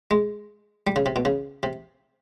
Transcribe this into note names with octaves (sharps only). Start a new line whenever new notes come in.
G#3
G3
C#3
C3
B2
C#3
C3